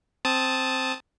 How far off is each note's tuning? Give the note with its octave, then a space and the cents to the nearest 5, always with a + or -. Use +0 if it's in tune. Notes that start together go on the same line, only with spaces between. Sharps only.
C4 +0 A5 -5 D#6 +0